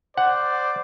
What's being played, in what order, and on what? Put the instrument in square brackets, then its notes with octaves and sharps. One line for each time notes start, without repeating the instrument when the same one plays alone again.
[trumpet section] C5 D5 [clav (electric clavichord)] F#5